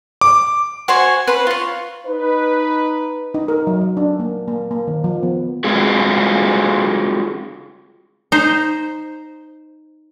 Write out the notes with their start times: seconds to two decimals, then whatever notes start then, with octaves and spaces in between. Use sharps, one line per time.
0.21 D6
0.88 F#4 C5 C#5 G#5
1.27 B4 C5 B5
1.47 F4 C#5
2.06 D#4 B4
3.34 D#4
3.48 A#4
3.67 F#3
3.81 F#3
3.97 D4
4.20 A#3
4.48 A#3
4.71 A#3
4.87 D#3
5.04 F3
5.23 B3
5.64 G#3 C4 F4 F#4 G#4
8.32 D#4 C5